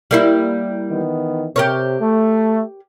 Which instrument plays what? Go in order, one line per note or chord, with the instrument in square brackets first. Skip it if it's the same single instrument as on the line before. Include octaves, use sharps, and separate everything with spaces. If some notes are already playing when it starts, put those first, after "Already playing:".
[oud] G3 A#3 E4
[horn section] D#3 E3 B3
[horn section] C3 [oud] G4 A#4 C#5
[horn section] A3